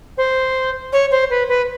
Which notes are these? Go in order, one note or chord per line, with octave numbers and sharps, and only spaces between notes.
C5
C#5
C5
B4
B4